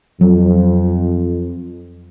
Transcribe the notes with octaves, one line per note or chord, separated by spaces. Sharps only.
F2 F#3